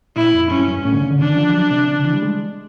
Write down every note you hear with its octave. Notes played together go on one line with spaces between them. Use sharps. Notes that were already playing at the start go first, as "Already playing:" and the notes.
A#2 E4
F2
F#2 C#4
G2
F#2
G2
A2 C#4
D3
C#3
D3
D#3 D4
F3
F#3
C3
C#3
D3
E3
G3
G#3